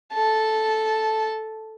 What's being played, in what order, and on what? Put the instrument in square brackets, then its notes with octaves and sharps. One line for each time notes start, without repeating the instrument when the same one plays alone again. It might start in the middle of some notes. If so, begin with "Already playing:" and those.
[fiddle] A4 A5